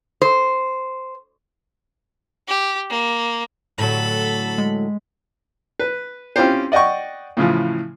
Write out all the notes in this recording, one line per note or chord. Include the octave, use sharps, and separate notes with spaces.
C5
G4
A#3
A2 D3 F#3 A4 B5
G#3
B4
C4 C#4 E4 F4 G4 C5
D5 D#5 F#5 G5 C#6
A2 C#3 E3 F3